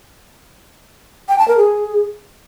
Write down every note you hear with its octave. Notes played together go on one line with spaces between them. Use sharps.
G5
A5
A#4
G#4